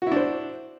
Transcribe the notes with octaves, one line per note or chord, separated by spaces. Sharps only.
D4 E4 F#4 C5